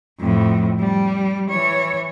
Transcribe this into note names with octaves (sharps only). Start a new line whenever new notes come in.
F2 A2
G3
E3 C#5